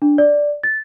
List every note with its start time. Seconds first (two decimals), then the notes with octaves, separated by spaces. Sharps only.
0.02 D4
0.18 D5
0.63 A6